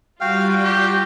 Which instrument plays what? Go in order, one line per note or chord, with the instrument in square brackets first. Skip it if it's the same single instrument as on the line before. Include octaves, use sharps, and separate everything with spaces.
[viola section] G3 F4 [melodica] F#4 G5 [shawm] F5
[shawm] G4